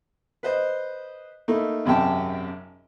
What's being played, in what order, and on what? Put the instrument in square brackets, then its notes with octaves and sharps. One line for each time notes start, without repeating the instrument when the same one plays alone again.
[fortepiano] B4 C5 D#5
A3 A#3 D#4 E4
G#1 F#2 C3 G5 A5